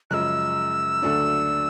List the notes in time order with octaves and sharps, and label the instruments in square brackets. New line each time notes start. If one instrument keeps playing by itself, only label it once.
[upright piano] F#2 C#3 F3 G#3 [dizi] E6 F#6
[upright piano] D2 D3 F#3 A3 D4